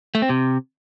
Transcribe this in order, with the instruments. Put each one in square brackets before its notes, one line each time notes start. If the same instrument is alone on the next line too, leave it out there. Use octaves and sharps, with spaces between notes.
[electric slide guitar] A3
C4
C3